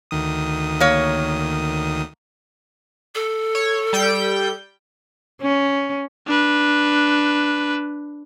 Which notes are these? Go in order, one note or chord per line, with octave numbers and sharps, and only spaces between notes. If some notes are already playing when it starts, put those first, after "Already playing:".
D2 D#3 D#6
A#3 C#5
A4
C#5
G3 G5 G6
C#4
D4 B4